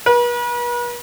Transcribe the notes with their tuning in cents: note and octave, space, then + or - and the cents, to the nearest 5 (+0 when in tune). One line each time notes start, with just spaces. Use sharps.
B4 -40